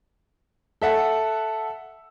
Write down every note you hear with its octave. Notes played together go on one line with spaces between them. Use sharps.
A4 E5 F#5